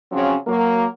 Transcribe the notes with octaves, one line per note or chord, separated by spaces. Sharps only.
C#3 F3 F#3 C4 C#4
F#3 A#3